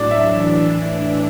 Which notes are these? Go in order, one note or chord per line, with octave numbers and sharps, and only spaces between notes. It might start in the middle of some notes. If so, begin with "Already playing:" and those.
Already playing: A2 F#3 D4 D5
E5
A2 E3 D4